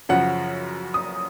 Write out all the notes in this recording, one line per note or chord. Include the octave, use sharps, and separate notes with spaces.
F#2 C#3 F3 F#5
D#6